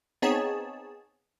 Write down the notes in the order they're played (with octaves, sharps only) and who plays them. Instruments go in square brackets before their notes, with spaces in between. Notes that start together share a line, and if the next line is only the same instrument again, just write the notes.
[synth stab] B3 C4 D#4 G#4 C#5 A5